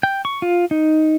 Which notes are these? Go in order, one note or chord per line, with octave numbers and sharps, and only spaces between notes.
G5
C#6
F4
D#4